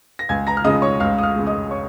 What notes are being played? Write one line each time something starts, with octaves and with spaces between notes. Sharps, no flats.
A#6
C#2 G#5 G#6
A#5 A#6
F6
C#3 G#3 D#5 D#6
C#5 C#6
C#2 F5 F6
D#6
F5 F6
C#3 G#3
D#5 D#6
C#5 C#6